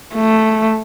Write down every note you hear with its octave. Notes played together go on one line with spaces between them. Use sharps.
A3